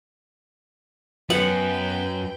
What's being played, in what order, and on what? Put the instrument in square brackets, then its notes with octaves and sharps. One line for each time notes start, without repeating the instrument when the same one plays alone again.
[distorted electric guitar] F#2 [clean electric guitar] B3 [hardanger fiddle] B4 G5 [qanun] F#5